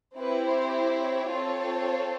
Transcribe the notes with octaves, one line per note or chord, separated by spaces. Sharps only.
C4 E4 G4 B4
C5
C5
C#5
C4 F4 A4